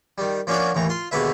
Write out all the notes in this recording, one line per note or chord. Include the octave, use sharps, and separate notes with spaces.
D#3 G3
F3 A#3 C#4 D4 F#4
A1 D#2 E3 A#5
F4 C6
D#2 B2 D3 G#3 B4 E5